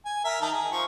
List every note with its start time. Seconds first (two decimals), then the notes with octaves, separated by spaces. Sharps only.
0.05 G#5
0.25 A#4 E5
0.41 D#3 A5 A#5
0.53 G#4
0.72 F3 C#6